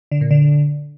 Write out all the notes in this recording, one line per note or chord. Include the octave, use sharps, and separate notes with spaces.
D3
A#2
D3